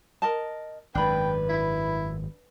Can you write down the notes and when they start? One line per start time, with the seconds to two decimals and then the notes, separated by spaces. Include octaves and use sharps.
0.22 A#4 D#5 A5
0.95 G#1 F#2 D4 B4 G5 B5
1.49 E4